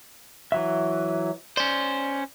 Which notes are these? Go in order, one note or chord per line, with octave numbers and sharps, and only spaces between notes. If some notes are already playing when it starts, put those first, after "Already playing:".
E3 F#3 E5
C#4 C5 D5